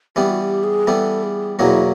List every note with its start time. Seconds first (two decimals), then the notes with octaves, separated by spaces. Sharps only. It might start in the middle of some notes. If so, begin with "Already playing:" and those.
0.16 E3 G3 B3 G4
0.30 F#4
0.40 G4
0.63 G#4
0.87 E3 G3 B3 A4
1.23 G#4
1.59 E2 B2 F#3 A#3 E4